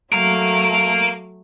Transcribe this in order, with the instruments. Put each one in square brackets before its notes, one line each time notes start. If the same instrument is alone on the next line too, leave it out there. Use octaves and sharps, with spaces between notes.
[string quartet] F#3 A3 [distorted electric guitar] A#4 F5